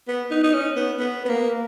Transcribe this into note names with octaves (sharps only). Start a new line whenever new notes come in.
B3
D#4
D#4
C#4
B3
B3
B3
A#3